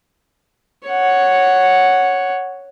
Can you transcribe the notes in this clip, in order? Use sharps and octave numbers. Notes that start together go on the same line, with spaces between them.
C#5 F#5